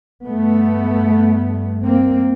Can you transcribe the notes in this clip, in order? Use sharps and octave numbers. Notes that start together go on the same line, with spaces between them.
G2 A3 B3
A#3 C4